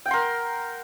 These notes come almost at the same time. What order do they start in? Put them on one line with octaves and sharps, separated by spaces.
G5 F#5 C6 A#4